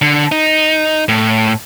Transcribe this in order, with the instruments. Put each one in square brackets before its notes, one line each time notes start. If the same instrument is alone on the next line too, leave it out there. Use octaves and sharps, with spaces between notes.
[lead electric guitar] D3
D#4
A2